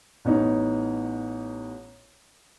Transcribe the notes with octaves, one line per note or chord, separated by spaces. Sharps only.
A1 B3 C#4 D#4